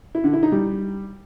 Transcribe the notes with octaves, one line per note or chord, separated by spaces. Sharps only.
E4
D3
E4
D#4
G3